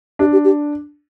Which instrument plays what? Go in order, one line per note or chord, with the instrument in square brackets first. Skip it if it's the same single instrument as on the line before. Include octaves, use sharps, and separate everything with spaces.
[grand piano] D4 [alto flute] G4
[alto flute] G4
G4